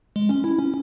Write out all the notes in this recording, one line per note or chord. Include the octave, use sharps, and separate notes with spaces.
G#3
C#4
E4
C#4